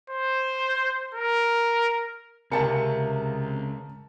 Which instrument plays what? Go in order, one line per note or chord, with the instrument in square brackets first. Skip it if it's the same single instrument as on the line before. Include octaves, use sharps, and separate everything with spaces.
[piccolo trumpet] C5
A#4
[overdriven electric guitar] C#2 [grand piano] C3 C#7 [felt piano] A#4 A5